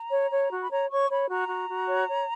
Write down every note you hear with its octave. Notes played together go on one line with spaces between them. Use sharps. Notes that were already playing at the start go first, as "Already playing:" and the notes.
Already playing: A#5
C#5
C#5
F#4
B5
C#5 A#5
C#5 C#6
C#5 B5
F#4 A#5
F#4
F#4
C#5
C#5